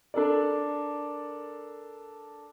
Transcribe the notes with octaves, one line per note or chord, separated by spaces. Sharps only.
D4 A4 A#4 D5